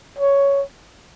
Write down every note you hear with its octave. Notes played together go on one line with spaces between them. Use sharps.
C#5